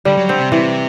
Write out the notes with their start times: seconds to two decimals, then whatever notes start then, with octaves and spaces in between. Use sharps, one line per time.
0.05 D3 G3
0.17 F#3
0.29 D3 C4
0.40 C3
0.52 C3 E3